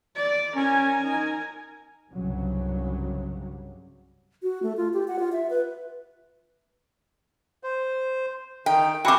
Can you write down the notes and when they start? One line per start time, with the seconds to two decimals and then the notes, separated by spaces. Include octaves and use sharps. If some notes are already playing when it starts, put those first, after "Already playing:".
0.16 D5
0.55 C#4 A#4 G#5
1.02 D#4
2.13 C2 G2 C#3 F#3 G3
4.43 F#4
4.63 A3
4.77 F4
4.93 G4
5.08 F#5
5.19 F4
5.32 E5
5.50 B4
7.64 C5
8.66 D#3 D#4 G5
9.05 C4 F#4 E5 F5 G5 G#5 B5 D6